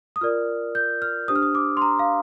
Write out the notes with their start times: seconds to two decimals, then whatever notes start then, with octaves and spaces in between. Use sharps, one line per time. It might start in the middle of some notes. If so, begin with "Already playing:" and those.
0.16 D#6
0.21 F4 A#4 D5 F6
0.75 G6
1.02 F6
1.28 D4 G4 C5 D#6
1.35 F6
1.42 D#6
1.55 D6
1.77 C6
1.82 A#5
1.99 F5